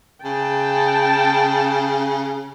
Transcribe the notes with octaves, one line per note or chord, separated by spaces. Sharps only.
C#3 G5 A5